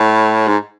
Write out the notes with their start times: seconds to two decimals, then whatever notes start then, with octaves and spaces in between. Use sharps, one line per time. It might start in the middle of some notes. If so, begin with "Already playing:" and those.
Already playing: A2
0.47 G#2